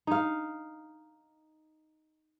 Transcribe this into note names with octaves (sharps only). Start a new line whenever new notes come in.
D#4 F5